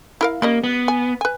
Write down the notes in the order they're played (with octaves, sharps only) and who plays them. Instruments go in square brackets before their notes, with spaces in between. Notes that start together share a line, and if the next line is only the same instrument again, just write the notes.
[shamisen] E4 A#4 F5
[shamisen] G3 C#4 D#5 [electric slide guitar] A#3
[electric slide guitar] B3
[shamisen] G#5
B4 G#5